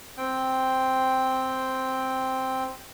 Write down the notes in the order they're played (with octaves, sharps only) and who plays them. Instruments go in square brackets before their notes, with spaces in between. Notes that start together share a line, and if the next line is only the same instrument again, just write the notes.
[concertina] C4 G5